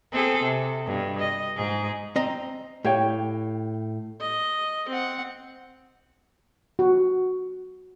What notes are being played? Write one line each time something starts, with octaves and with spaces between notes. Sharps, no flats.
C4 G#4 A4
C3
G2 B2
D#5
G#2 G#4
C4 D#5 A#5
A2 G4 C#5 G5
D#5
C4 F#5
F#4